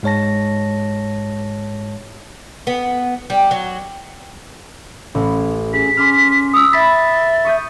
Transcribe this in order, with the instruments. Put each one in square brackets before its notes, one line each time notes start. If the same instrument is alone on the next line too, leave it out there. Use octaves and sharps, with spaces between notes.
[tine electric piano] G#2 G#3 C#5 A5 A#6
[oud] B3
G3
F#3
[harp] A1
[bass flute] C#4 [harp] G#4 [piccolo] B6
[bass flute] C#4 [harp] C6 D6 F6
[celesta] D#6 E6 [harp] D7
[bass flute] E5 [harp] B5 [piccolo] A6 [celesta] B6
[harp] C#6 D#6 G6